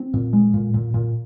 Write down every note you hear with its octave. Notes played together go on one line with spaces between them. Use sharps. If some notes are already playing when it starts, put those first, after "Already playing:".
Already playing: C4
A#2
G#3
A#2
A#2
A#2